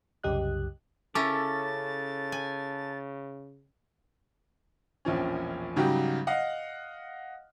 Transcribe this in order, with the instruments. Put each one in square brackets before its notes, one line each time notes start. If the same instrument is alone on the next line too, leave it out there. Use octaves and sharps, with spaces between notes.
[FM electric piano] C2 F#2 C#3 G4 D#5 F#6
[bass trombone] C#3 [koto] C#4 E4 A#4 [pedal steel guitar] A4 D6 [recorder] A6
[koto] G#5
[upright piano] E1 A#1 F3 C#4
G#2 C#3 F#3 G3 F#4 G4
D#5 F5 F#5